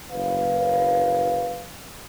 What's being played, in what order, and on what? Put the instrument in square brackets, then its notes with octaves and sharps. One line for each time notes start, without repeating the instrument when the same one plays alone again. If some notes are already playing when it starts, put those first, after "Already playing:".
[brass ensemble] F#1 B4 F5